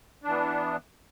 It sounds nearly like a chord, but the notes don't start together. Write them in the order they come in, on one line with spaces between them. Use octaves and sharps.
D4 E3 B3